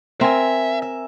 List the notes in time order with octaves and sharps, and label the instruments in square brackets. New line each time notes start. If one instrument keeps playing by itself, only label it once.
[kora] C4 [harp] A#4 G#5 [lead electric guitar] E5
[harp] E5